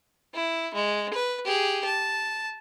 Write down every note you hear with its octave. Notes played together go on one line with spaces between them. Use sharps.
E4
G#3
B4
G4 G#4
A5